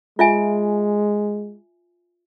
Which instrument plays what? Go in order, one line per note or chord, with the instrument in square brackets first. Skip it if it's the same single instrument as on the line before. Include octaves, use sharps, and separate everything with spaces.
[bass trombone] G#3 [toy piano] F4 E5 G#5